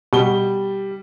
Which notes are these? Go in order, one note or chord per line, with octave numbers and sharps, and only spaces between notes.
B2 G3 G7